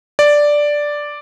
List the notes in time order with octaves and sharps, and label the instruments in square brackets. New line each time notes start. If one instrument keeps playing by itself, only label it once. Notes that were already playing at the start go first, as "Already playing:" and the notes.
[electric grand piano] D5